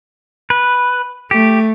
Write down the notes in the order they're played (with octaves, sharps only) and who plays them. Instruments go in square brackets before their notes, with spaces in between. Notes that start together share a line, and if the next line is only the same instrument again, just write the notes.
[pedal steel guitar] B4
[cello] A3 [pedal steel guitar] G4